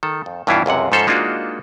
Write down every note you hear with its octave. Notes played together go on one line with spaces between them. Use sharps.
D#3 A4
F2
G2 B2 E3 C#4 E4 F4
C#2 F#2 C3 F#5
G#2 F3 C#4 A4 C5 C#5
G#3 A#3 D4 D#4 F4 F#4